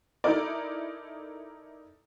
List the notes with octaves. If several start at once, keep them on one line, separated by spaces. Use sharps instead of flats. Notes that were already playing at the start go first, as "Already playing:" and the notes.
D#4 E4 A4 A#4 D5